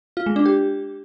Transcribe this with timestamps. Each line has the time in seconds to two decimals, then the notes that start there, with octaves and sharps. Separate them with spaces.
0.17 F4
0.26 G#3
0.36 D4
0.46 G4